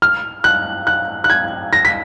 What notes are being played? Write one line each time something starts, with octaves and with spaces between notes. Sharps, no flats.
F6
F#6
F#6
F#6
G#6
A#6
B6